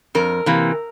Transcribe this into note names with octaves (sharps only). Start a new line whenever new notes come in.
F2 A#4
C3 E3 A#3